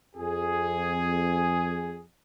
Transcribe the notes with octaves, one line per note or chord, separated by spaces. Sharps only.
F2 G#4